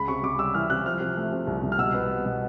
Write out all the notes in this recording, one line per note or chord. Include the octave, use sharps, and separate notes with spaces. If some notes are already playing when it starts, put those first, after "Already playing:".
Already playing: C#2 B5
C3 C#6
C3 D6
G3 E6
E3 F6
C3 F#6
F3 F6
C3
A3
C3
C2
C2
F6
B2 E6
B3
B2
B2